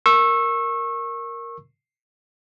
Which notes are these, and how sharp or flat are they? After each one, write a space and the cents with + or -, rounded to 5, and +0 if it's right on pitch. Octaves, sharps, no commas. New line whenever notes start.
A#4 +0 C#6 -25 E6 +0